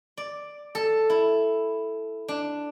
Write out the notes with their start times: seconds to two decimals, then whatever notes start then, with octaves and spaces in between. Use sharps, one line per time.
0.17 D5
0.75 A4
1.10 E4
2.28 D4